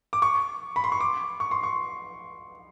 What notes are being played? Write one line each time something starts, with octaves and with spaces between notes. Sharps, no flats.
D6
C#6
B5
C6
C#6
D6
C#6
C6
C#6